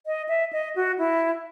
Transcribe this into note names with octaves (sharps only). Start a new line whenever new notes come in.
D#5
E5
D#5
F#4
E4